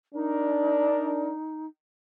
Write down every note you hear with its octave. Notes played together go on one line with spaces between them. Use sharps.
D4 D#4 A#4